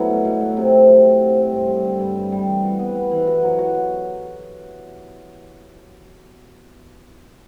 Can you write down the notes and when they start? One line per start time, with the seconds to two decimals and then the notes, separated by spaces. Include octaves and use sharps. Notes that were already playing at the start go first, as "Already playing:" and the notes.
Already playing: F#3 A3 B3 E4
0.09 B2
0.25 B2
0.41 A3
0.57 C3
0.73 C4
0.89 F#3
1.04 F#4
1.20 C3
1.36 C4
1.52 G2
1.68 G3
1.84 D3
1.99 G2
2.16 G2
2.32 G3
2.48 E3
2.63 F#4
2.79 B3
2.95 B4
3.11 E3
3.27 F#4
3.43 F#3
3.59 F#4